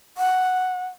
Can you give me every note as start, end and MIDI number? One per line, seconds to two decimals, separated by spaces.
0.17 0.85 78